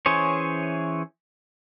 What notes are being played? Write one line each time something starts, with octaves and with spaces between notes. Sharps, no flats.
E3 C#4 G#4 C5 C#5